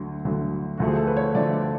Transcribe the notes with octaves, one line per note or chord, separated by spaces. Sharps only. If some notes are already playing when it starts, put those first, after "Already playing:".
Already playing: D2 D3 F#3
D2 D3 F#3
D2 D3 F3 A3 F#4
G#4
A4
B4
C#5
D2 D3 F3 A3 D5
D5